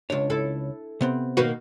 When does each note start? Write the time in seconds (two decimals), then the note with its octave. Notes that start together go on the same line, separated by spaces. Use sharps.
0.10 C#2 D4 C#5
0.30 E4 A4
1.01 C3 B3 C4
1.37 B2 D#3 A#3 F#4 B4